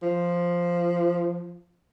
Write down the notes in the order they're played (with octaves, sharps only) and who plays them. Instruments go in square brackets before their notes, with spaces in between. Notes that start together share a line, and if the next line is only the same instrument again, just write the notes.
[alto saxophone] F3